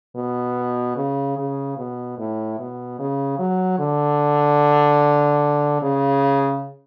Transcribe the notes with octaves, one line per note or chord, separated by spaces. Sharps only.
B2
C#3
C#3
B2
A2
B2
C#3
F#3
D3
C#3